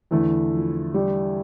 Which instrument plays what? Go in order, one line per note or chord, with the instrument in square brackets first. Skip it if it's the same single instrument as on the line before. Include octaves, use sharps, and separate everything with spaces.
[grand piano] E2 D3 A3 E4 [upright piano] E3
[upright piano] F3
G3